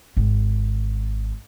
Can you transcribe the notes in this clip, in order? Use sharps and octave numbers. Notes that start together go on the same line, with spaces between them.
G#1